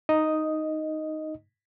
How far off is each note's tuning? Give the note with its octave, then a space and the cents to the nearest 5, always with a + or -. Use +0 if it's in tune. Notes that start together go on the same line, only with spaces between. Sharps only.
D#4 +0 D#5 +0 D#6 +0